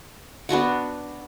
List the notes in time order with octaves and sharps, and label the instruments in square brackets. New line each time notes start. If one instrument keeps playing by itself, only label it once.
[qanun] B3 D4 F#4 F#5